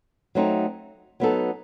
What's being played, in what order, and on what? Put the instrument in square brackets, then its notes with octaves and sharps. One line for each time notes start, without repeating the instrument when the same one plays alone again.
[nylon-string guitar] F#3 A3 C4 D#4
F#3 B3 D#4 A4